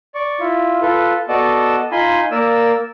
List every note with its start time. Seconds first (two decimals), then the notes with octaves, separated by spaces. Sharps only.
0.15 D5 C#6
0.40 E4 F4
0.82 F4 A4 B4
1.29 B3 F#4 A4 D5 D#5 A5
1.92 D#4 F4 G#5 B5 C6
2.31 A#3 A#4 D5 E6